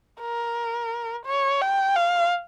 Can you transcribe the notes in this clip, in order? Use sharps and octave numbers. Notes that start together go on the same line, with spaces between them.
A#4
C#5
G5
F5